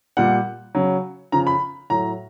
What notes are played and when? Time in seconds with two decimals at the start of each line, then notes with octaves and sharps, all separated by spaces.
0.17 A#2 G3 F#5
0.75 C#3 F#3
1.32 C#3 F3 A#5
1.47 B5
1.90 A2 F#3 A#5